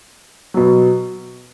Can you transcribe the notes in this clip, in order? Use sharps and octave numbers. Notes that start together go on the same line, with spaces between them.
B2 F#3